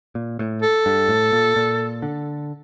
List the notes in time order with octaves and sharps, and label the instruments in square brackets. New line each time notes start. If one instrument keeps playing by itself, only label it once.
[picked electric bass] A#2
A2
[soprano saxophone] A4
[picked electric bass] G2
A2
A#2
A#2
D3